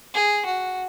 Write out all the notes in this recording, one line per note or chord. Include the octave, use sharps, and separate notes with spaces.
G#4
F#4